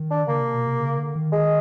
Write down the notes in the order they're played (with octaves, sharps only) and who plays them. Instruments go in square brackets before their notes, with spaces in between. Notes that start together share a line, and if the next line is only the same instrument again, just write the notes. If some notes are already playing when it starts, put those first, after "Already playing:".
Already playing: [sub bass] D#3
[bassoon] D4
[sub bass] D3
[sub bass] C#3 [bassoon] A#3
[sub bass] C3
B2
C3
C#3
D3
D#3
[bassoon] G#3